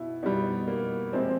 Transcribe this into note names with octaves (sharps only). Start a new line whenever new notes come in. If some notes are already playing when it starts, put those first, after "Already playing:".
Already playing: B2 E4
B2 G3 D#4
A#3
C3 F3 G#3 C4